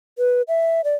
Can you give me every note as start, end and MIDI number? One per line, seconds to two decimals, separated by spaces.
0.18 0.42 71
0.48 0.81 76
0.84 0.95 74